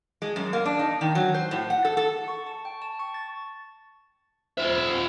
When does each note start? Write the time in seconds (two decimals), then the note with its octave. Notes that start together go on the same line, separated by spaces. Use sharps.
0.22 G#3
0.36 F#2
0.53 A#3
0.65 D4
0.79 D#4
1.01 D#3
1.15 F#3
1.34 C5
1.51 A2
1.70 F#5
1.85 A4
1.97 A4
2.28 C#6
2.47 A5
2.65 G5
2.82 A5
2.99 C#6
3.14 A6
4.57 F4 C5 E5